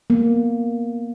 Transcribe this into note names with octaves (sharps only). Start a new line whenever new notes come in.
A#3 B3